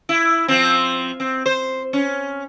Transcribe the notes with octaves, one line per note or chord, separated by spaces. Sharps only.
E4
F3 C4
C4
C5
C#4